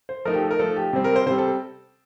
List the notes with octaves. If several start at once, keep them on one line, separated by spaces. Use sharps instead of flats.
C5
F3 A3 D#4 A#4
G4
A4
A#4
F3 A3 D#4 A4
G4
C3 G3 C4
A#4
C5
C3 G3 C4 C5
A4